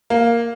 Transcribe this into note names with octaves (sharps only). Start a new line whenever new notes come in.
A#3